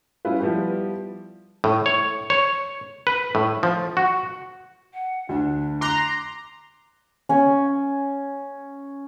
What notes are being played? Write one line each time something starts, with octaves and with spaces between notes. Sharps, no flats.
G3 C#4 E4 F4 B4
F3 G3 B3 E4 G4
A2
C#5
C#5
B4
A2
F3
F#4
F#5
D2 D4
A#5 C6 D6 F#6
C#4 G#5